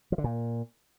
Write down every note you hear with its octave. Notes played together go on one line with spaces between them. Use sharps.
F3
D3
A#2